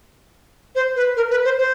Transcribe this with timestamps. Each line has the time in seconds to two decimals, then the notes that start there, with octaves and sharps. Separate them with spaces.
0.75 C5
0.96 B4
1.17 A#4
1.31 B4
1.45 C5
1.58 C5